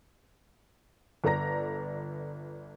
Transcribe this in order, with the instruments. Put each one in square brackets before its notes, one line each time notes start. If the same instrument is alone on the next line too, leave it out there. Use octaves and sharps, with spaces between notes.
[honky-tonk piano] G1 A4 D5 A#5 A#6